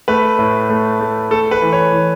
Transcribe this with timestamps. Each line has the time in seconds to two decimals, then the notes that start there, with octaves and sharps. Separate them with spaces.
0.08 A3 B4
0.38 A2
0.70 A3
1.01 A3
1.31 A3 A4
1.51 B4
1.62 E3
1.73 C#5
1.92 E3